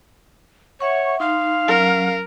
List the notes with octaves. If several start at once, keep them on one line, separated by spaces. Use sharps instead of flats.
C#5 E5 F#5 C#6
D#4 F5 C6
F#3 C#4 A#4